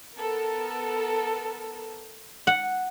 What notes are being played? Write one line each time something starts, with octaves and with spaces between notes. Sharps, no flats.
B3 A4 A#4
F#5